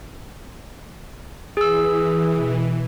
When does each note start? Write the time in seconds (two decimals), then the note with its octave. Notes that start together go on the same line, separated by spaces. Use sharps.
1.57 E3 G#4 E6
2.35 B2